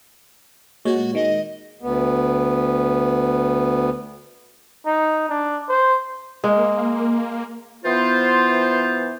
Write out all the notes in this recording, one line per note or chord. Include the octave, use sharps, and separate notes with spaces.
A#2 G#3 F#4 C#5
D#3 G#3 D#5
D2 B3
D#4
D4
C5
G#3 A#3
E3 B3 F4 C5